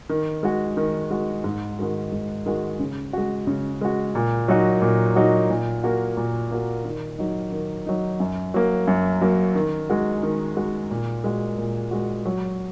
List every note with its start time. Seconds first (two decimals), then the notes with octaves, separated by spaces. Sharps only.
0.09 D#3
0.43 G#3 F#4
0.77 D#3
1.11 G#3 F#4
1.44 G#2
1.79 D#3 G#3 F#4
2.12 G#2
2.46 D#3 G#3 F#4
2.79 C#3
3.13 G#3 F#4
3.47 C#3
3.81 G#3 F#4
4.15 A#2
4.48 F#3 D#4 F#4
4.82 A#2
5.16 F#3 D#4 F#4
5.50 A#2
5.84 A#3 F#4
6.17 A#2
6.51 A#3 F#4
6.85 D#3
7.18 F#3 D#4
7.52 D#3
7.87 F#3 D#4
8.20 F#2
8.54 F#3 A#3
8.87 F#2
9.21 F#3 A#3
9.55 D#3
9.90 G#3 F#4
10.23 D#3
10.57 G#3 F#4
10.91 A#2
11.24 G#3 F#4
11.58 A#2
11.91 G#3 F#4
12.26 F#3